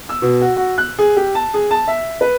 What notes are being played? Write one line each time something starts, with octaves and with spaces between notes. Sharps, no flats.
E6
B2
F#4
F#4
F#6
G#4
G4
A5
G#4
A5
E5
B4